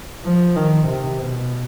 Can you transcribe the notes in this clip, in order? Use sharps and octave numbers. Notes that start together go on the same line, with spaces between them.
F3
D#3
C3
B2